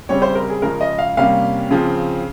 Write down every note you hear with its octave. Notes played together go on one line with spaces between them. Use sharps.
C#3 G3 C4 C#5
C5
A#4
G#4
C#3 F3 G#3 A#4
D#5
F5
C3 G3 A#3 C#4 F5
C#3 F3 C4